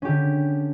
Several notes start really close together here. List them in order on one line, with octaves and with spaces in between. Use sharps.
C#4 G4 D3